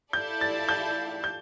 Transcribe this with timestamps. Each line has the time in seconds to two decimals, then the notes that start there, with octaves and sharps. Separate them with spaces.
0.13 E4 A4 D5 F5 A5 G6
0.41 A6
0.69 G6
1.24 G6